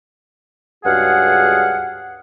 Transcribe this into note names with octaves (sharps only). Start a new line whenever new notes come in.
C#2 G2 F#4 G#4 F5 F#5